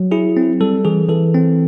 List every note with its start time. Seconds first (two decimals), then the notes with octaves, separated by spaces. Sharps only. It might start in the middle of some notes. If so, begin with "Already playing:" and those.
Already playing: F#3
0.11 E4 G#4
0.37 C4
0.61 G3 A4
0.85 E3 G#4
1.09 E3 A4
1.35 C4